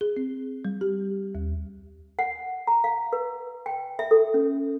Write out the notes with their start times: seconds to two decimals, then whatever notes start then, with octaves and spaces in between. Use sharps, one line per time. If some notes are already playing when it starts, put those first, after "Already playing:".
0.01 G#4
0.17 C4
0.65 G3
0.81 G4
1.35 D#2
2.19 F#5
2.67 A#5
2.84 F5
3.13 B4
3.66 G5
3.99 E5
4.11 A4
4.34 C#4